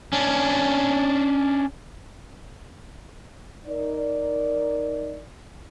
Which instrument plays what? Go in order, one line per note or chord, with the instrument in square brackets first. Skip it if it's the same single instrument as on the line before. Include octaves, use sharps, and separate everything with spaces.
[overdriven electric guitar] C#4 D4
[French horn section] D#4 A#4 D5